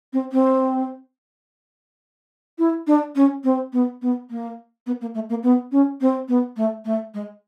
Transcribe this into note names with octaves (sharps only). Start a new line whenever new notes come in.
C4
C4
E4
D4
C#4
C4
B3
B3
A#3
B3
A#3
A3
A#3
B3
C#4
C4
B3
A3
A3
G#3